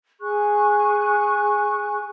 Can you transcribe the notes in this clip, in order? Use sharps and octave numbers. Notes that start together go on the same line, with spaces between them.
G#4 G#5 C#6 F#6